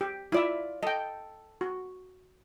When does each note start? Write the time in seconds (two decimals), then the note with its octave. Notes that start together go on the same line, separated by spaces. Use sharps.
0.01 G4
0.32 E4 F4 D5 E5
0.83 A4 D#5 G5
1.61 F#4